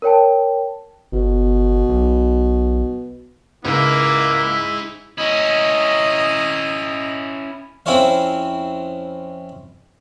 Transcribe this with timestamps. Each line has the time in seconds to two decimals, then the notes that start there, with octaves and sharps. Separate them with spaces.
0.02 A#4 C#5 G5 A5
1.12 G1 B2
1.89 B1
3.65 C#2 A#3 D#4 E4 G#4
5.18 C#4 E4 D#5 A#5
7.86 F2 C4 C#4 E4 C#5 F5